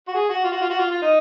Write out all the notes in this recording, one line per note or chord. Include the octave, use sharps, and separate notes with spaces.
F#4
G#4
F#4
F4
F#4
F4
F#4
F4
F4
D#4